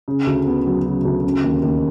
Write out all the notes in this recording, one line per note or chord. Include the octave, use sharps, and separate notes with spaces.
C#3
D2
B3
F#3
C#3
D2
C#3
D#2
D#2